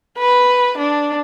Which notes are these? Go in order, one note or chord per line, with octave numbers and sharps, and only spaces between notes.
B4
D4